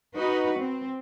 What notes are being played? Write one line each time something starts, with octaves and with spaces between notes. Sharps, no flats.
D#4 F#4 B4
C4